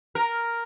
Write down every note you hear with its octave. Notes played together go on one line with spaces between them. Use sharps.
A#4